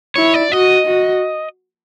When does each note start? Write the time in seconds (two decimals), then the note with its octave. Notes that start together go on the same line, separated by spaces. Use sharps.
0.16 E4 C#5
0.34 D5
0.52 F#4 D#5
0.87 F#4